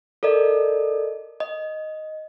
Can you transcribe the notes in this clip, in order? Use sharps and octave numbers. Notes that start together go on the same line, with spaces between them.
A4 A#4 D5 D#5
D#5